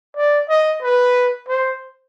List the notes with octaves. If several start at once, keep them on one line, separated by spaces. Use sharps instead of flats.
D5
D#5
B4
C5